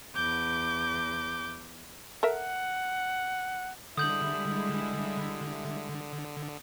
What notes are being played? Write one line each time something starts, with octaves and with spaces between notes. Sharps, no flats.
E2 D6 G6
A4 A#4 E5 F#5
D3 G3 G#3 E4 D#6 G6 F#7